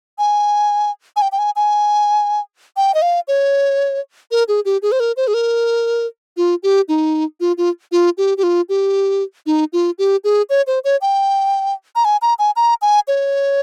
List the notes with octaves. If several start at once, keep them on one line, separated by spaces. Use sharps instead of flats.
G#5
G#5
G5
G5
G#5
G#5
G5
D#5
F5
C#5
A#4
G#4
G4
G#4
C5
A#4
C5
G#4
A#4
F4
G4
D#4
F4
F4
F4
G4
G4
F4
G4
D#4
F4
G4
G#4
C#5
C5
C#5
G5
A#5
G#5
A#5
G#5
A#5
G#5
C#5